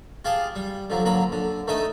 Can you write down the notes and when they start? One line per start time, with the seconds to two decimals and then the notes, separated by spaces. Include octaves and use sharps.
0.25 F4 G4 G#4 F5 A5
0.56 G3
0.90 D3 F3 F#3
1.05 A#2 D3 F#3 A#5 B5
1.32 D3
1.67 D#3 A3 D4 D#4 E5 D#6